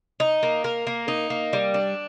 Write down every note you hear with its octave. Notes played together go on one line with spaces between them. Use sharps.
D#4
A#3
A#4
A#3
D#4
A#3
G3
D4